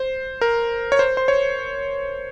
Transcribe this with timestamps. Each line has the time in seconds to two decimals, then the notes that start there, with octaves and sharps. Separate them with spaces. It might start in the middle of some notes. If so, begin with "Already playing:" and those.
Already playing: C5
0.41 A#4
0.92 C#5
0.99 C5
1.17 C5
1.28 C#5